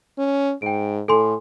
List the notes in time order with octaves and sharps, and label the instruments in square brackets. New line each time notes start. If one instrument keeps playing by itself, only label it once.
[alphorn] C#4
[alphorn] G#2 [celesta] G5 D7
[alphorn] A2 [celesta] A4 G#5 C6